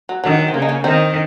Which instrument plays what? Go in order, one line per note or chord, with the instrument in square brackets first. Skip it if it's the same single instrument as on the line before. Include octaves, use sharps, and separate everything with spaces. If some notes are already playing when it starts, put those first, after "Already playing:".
[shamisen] F#3
[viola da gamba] D#3 [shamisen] F#3
[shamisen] F#3
C4
[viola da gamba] C#3 [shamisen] A#3
[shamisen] D#4
A#3 C#4
[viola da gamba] D#3 [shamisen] C4 D#4